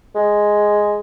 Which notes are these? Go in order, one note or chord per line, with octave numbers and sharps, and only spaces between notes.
G#3